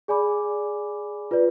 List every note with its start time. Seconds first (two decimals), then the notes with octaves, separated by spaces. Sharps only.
0.08 G#4 D5 G#5 B5 D6
1.31 F4 B4 D5